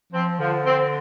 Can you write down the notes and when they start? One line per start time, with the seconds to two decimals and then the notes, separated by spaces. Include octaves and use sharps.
0.13 F3 C4
0.39 D3 F3
0.66 C4